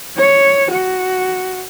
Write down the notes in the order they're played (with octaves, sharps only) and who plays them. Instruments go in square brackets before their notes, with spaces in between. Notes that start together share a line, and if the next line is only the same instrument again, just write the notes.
[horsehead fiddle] C#5
F#4